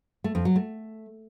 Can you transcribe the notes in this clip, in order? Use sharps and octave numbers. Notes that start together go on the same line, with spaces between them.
A3
F2
F#3
A3